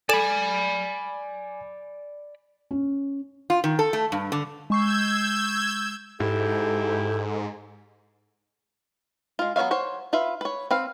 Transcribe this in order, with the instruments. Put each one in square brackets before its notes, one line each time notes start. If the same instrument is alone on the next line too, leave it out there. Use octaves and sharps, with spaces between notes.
[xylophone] A4 E7 [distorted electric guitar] D5 B5 [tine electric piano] G#5
[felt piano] C#4
[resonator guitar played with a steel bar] F4
D#3
A4
A3
G2
D3
[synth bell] G#3 C#6 C7 [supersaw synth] E6 G6 G#6
[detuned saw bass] G#2 [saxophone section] E4 G4 [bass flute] A4
[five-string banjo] G#3 F4
F#3 B3 C#5 E5 F5
C5 C#5 F#5
F4 B4 E5
B4 C#5
C4 B4 F5